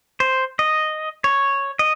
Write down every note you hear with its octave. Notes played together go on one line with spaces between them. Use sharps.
C5
D#5
C#5
D#5